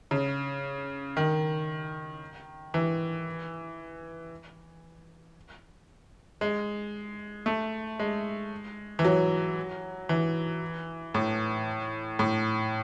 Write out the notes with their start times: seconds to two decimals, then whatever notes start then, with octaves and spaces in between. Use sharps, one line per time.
0.11 C#3
1.17 D#3
2.74 E3
6.41 G#3
7.46 A3
7.99 G#3
8.99 E3
9.05 F#3
10.09 E3
11.14 A2
12.19 A2